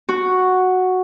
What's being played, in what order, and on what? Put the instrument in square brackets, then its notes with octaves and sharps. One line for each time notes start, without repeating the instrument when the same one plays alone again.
[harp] F#4